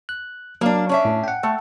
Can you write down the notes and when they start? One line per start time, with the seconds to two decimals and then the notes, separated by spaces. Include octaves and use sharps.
0.09 F#6
0.61 F#3 A#3 D4 F5
0.89 C#4 D4 E5
1.05 A2 A3
1.24 F#5 G5
1.43 A3